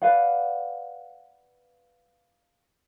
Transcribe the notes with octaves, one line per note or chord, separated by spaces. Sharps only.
B4 D5 F5 F#5